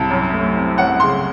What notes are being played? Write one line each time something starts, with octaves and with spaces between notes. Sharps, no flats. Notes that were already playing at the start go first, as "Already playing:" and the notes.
Already playing: C2 A5
F#2
A3
C4
F#2 F#5
C#3 C6